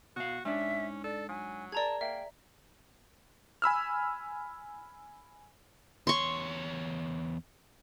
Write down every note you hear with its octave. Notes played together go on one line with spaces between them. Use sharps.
B2 F#4 F5
G#2 C#4 D4 E5
A4 D5
F#3 G#5
G#4 A#4 D5 A5 A#5 G#6
A#3 E5 G5
G#5 B5 E6 F6
E2 C#5 C6 C#6